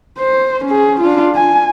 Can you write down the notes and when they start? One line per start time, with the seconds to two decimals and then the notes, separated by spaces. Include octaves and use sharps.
0.19 C5
0.65 C#4 G#4
1.01 D4 F4
1.35 G#5